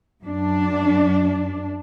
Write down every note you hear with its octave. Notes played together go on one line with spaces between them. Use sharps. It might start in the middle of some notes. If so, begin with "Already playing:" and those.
F#2 D4